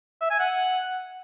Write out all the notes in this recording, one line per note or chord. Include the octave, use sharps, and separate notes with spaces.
E5
G#5
F#5